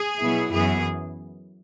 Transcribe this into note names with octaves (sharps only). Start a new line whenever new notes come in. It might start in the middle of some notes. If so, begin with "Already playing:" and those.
Already playing: G#4
B2 F#3 B3 E4
F#2 E3 B3 G#4